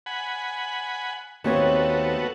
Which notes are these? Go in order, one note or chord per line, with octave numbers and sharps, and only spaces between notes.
F#5 G#5 B5
D#2 A3 B3 C4 F#4 C#5